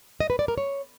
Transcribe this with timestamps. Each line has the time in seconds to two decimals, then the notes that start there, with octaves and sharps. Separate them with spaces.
0.20 D#5
0.30 B4
0.39 D5
0.48 A#4
0.58 C#5